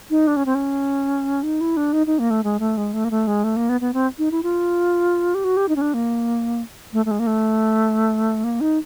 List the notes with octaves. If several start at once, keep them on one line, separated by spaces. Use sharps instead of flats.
D#4
D4
C#4
C4
C#4
D#4
E4
D4
D#4
D#4
A#3
A3
G#3
A3
G#3
A3
A#3
A3
G#3
A3
A#3
B3
B3
C4
D#4
E4
F4
G4
F#4
G4
D#4
C#4
D4
A#3
A3
A3
G#3
A#3
A3
A#3
D#4